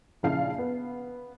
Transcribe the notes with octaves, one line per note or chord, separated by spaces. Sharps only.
A#1 C#3 E4 F5 A5 C7
B3